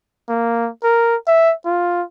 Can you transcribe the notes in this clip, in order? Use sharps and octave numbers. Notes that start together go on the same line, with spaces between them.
A#3
A#4
E5
F4